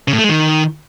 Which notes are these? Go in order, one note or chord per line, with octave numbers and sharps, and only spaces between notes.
C#3
A2
A3
G#3
D#3